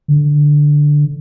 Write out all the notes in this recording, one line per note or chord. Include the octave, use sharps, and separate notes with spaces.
D3